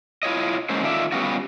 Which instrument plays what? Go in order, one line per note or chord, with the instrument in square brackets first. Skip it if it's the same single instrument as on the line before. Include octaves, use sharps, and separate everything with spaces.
[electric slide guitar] E4 F4 C#5 D#5
F#3 G#3 A#3 C#4 C5
D#3 F4 A4 D5 E5
G3 B3 C#4 F4 F#4